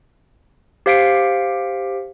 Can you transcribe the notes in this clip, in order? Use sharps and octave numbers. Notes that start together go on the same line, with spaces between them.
G4 C5 F5 B6 C#7 D7